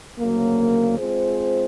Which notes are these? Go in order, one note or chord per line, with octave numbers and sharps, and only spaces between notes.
D2 C#3 F#3 A#3
G#3 C4 F4 G#4 C5